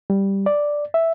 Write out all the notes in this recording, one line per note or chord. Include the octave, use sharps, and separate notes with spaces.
G3
D5
E5